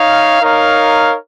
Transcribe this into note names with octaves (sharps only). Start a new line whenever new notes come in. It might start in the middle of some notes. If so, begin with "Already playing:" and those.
Already playing: D#4 C#5 F5
D#4 A#4 C#5 F5